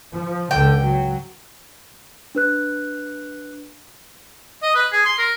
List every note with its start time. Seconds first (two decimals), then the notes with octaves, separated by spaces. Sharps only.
0.12 F3
0.51 C#2 D3 G5
0.83 F#3
2.35 D4 B4 F#6
4.63 D#5
4.75 B4
4.92 G#4
5.05 C6
5.18 A#4